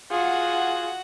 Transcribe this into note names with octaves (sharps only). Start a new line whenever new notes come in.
F4 F#4 G#4 F#5